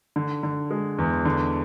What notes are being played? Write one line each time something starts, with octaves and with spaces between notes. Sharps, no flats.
D3
D3
G#3
E2
D3